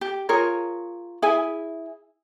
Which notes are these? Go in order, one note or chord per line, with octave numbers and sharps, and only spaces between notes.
G4
F4 G#4 A#4 C#5
E4 G#4 E5 G#5